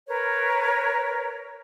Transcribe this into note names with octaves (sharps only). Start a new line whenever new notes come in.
A#4 B4 C#5